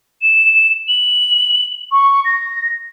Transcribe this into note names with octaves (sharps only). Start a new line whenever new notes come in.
E7
F#7
C#6
A#6